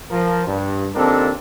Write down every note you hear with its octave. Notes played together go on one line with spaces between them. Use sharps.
F3 A#4
G2
D#2 C4 D4 F4 A4 A#4